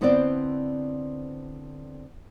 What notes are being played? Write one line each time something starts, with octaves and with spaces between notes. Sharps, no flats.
D3 B3 C4 E4 C5 D5